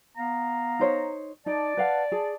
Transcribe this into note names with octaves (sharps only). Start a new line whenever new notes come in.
B3 F5 A#5
D#4 C5 C#5
D#4 D5 A5
B4 F5 F#5
G#4